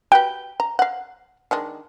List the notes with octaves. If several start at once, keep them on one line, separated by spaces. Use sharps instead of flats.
F#4 G4 B4 G5
A#5
F5 F#5
D#3 G#3 D4